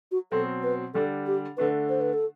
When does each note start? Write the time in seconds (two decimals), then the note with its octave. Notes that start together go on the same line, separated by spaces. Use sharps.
0.12 F#4
0.32 B2 F#3 C4 A4
0.63 B4
0.94 D3 G3 D4 A4
1.27 G4
1.57 D3 A3 D4 B4
1.89 C5
2.01 B4
2.13 A4